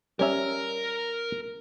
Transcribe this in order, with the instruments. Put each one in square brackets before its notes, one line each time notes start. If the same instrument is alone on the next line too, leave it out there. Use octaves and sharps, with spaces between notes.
[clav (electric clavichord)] G3 C#4 E5 [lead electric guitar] A#4 A#5